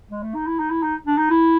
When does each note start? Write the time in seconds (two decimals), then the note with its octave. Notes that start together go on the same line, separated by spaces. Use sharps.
0.11 G#3
0.23 A3
0.35 D#4
0.47 E4
0.59 D#4
0.70 E4
0.83 D#4
1.07 D4
1.18 D#4
1.30 E4